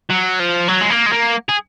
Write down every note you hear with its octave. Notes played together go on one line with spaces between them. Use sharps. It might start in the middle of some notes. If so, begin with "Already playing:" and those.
F#3
F3
F#3
G#3
A#3
G#3
A#3
G#4